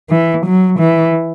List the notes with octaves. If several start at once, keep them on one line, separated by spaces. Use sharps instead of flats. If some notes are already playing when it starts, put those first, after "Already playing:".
E3
F#3
E3